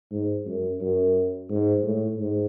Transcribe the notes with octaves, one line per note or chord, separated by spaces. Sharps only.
G#2
F#2
F#2
G#2
A2
G#2